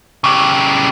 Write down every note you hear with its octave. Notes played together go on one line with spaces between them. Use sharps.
C#3 G4